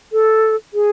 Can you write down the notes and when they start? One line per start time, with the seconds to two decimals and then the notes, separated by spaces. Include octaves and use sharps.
0.12 A4
0.74 G#4